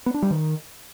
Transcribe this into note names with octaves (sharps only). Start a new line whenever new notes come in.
B3
D4
G3
D#3